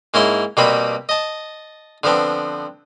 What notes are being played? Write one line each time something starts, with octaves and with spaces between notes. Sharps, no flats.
G#2 A#3 C#4 E4 C6
B2 G3 A#3 C4 B4 B5
D#5 A5
D3 F3 B3 C4